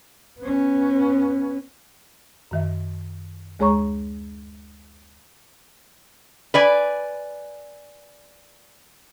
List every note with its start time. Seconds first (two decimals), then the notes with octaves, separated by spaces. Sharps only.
0.40 B3 C#4
2.51 F#2 D#3 E5
3.59 D2 G#3 G#4 C#5 A#5 C#6
6.54 B4 D5 G#5